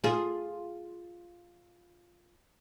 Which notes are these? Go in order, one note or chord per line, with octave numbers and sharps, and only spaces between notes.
F4 G#4